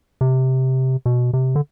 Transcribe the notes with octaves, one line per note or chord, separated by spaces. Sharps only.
C3
B2
C3
D3